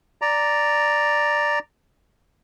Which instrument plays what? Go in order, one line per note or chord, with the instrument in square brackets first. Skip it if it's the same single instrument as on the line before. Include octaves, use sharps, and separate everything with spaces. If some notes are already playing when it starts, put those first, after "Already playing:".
[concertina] D5 A#5